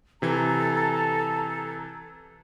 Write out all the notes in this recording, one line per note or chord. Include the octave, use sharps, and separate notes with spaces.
C3 E3 A4 A#5 G#6